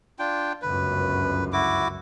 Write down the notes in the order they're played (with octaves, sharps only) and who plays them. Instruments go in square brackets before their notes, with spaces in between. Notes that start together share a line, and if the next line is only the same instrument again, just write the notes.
[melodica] D4 F4 G5
[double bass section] G1 C#2 F#2 [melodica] B4
[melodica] E4 F#4 D6